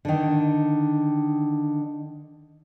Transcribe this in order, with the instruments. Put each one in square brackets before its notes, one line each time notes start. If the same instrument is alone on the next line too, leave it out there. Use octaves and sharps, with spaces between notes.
[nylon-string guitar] D3 D#3